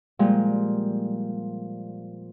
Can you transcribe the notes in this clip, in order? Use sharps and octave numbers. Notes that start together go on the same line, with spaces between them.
A#2 F3 G3 G#3